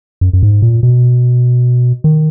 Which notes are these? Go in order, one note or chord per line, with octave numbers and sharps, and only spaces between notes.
F#2
F#2
G#2
A#2
B2
D#3